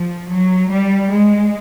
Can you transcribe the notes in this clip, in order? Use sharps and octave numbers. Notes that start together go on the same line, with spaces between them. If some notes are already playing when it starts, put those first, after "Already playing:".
Already playing: F3
F#3
G3
G#3